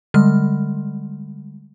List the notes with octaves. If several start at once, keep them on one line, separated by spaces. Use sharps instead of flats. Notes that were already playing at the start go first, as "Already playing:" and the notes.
D3 G3 G#3 F6